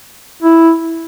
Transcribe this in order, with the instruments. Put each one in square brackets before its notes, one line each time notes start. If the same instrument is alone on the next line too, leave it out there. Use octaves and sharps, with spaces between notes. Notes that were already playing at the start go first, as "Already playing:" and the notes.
[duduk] E4